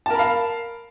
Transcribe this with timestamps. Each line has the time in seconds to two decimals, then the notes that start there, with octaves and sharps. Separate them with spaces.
0.06 A5
0.10 A#4
0.15 B5
0.19 F5